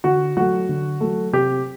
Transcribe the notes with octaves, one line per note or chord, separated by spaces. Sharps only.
D3 F#4
F#3 A3 F#4
D3
F#3 A3
C3 G4